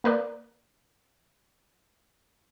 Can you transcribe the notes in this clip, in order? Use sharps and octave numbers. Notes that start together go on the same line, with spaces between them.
A#3 A#4 B4 D5